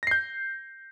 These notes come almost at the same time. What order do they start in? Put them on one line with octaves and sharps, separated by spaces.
A#6 C7 G6